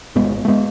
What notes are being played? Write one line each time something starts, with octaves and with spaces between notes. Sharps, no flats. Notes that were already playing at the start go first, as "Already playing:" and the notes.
G#1 G#2 G#3 B3
A3
G#3 B3